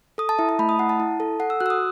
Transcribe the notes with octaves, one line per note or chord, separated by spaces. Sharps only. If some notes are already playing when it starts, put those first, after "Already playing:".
A4 D#6
A5
E4 E5
A5
A3 B5
D#6
E4 F#5
A5
E4
A4
A4 F#5
E6
F#4 F#6
E6
D#6